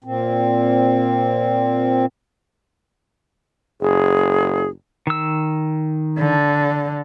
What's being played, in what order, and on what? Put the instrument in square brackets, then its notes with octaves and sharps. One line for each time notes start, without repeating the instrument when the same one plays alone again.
[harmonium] A#2 C4
[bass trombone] F#1 [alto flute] G#4
[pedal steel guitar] D#3 E6
[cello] D3